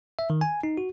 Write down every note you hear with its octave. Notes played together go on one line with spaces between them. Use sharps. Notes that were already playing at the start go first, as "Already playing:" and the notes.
E5
D#3
G#5
D#4
F#4